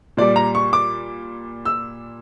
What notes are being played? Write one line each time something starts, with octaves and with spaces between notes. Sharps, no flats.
A#2 G3 D5
A#5
C#6
D6
E6